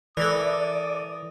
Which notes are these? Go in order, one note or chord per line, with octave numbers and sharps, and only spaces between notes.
E3 A4 A#4 D5 D#6